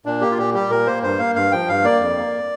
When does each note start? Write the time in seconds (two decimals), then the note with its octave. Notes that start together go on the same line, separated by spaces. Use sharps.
0.06 A#2 D4
0.21 A#3 G4
0.31 F4
0.38 A#2 G4
0.54 G3 G4
0.70 A#2 A#4
0.87 A#3 C5
1.03 G2 C5
1.19 A#3 F5
1.36 G2 F5
1.52 F3 G5
1.68 G2 F5
1.84 A#3 D5
2.01 F2
2.17 A#3